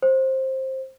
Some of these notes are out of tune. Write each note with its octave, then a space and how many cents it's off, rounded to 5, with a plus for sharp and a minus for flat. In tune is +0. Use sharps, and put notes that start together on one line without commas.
C5 +15